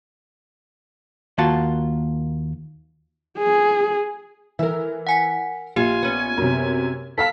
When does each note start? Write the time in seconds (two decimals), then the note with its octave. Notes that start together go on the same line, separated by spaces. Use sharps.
1.38 D#2 A#3 F4 F#4 A5
3.38 G#4
4.59 E3 A#4 E5
5.07 F#5 G#5 B6
5.76 A#1 F4 G4 G#5
6.02 B3 C#4
6.37 F#2 C3
7.18 A4 F5 A5 B6